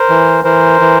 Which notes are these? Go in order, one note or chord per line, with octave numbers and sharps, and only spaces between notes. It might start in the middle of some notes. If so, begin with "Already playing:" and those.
Already playing: A#4 C5
E3
E3 A#4 C5
E3